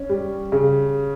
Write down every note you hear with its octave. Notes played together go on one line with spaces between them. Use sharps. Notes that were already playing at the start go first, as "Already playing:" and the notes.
Already playing: C#4
G3
C#3